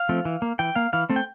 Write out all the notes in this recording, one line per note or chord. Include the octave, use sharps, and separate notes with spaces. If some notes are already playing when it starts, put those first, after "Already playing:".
Already playing: F5
F3 A3 C4
E3
A#3
E3 G5
A#3 F5
E3 F5
A3 C4
G5